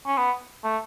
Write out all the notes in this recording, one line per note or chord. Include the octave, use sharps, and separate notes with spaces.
C#4
B3
A3